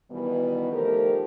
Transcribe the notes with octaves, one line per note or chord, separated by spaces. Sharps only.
B2 D#3 E3 G3 B3
D#3 F3 A3 G4 A#4